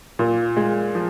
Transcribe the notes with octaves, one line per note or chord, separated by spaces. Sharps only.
A#2
G#3
F3